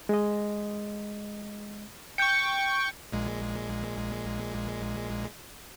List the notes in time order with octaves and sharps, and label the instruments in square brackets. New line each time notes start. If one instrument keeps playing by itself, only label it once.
[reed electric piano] G#3 D#5
[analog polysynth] G5 C#6 [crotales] G6 C#7
[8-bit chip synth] A#1 A#2 G#3